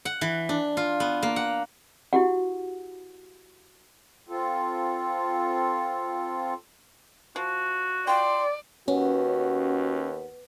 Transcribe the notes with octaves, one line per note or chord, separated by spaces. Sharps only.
F#5
E3
D4
F4
B3
A#3
F#5
E4 F#4 G4 F#5
C4 F4 A4
F3 F#4
F4 D5 G5 C6
D#2 B3 C#4 F#4